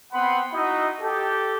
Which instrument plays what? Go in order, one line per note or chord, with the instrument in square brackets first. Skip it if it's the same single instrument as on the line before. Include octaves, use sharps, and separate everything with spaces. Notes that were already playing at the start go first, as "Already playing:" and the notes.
[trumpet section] B3 C4 F#5 B5 C6
D#4 E4 F#4 D#5 E5
G4 A4